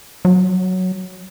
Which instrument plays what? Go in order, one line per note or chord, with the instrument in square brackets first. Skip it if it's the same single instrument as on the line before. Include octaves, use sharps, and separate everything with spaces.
[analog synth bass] F#3